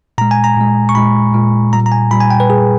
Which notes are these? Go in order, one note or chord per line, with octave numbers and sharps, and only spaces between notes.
A#2 G#3 A#5
G#5
A#5
A#2 G#3
C#6
A#2 G#3 B5
A#2 G#3
A#2 G3 A#5
A#5
G#5
A#2 G3 B5
G#5
G5
B4
A#2 G3 G#4